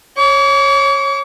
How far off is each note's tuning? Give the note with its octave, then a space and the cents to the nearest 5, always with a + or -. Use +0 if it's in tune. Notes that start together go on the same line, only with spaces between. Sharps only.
C#5 -15 D6 -45